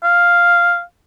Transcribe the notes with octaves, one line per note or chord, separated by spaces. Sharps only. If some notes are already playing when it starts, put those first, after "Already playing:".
F5